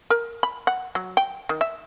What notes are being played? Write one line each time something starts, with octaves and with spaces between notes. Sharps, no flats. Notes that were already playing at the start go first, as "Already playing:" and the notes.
A#4
B5
F#5
F#3
G5
D#3
E5